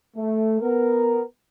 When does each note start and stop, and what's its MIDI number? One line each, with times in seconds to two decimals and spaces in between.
0.17 0.61 57
0.61 1.22 59
0.61 1.22 70